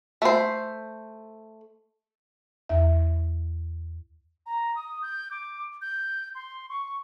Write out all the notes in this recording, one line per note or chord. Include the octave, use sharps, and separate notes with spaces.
A3 C5
E2 E5
A#5
D#6
G6
D6
G6
C6
C#6